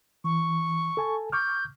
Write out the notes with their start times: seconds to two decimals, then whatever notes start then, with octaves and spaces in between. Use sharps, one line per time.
0.24 E3 C#6
0.97 A4 G#5 A5
1.32 C#6 D6 F6 G6